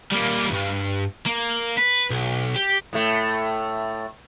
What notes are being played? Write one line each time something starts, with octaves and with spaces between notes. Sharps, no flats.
G3 A#3
D2 G2
A#3
B4
B1
G4
A2 A3